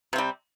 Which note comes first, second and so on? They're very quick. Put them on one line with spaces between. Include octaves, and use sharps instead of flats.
C3 C4 G3